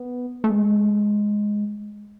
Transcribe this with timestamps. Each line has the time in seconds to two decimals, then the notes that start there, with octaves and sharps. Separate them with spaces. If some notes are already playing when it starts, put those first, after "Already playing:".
Already playing: B3
0.44 A3
0.51 G#3